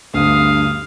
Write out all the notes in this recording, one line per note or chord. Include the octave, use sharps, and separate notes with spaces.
D2 G2 F5 D#6